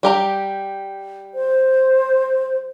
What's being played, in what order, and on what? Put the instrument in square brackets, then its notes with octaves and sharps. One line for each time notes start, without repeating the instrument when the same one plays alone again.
[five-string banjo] G3 G4 A#5
[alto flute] C5